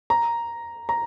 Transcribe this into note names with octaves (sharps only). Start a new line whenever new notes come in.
A#5
A#5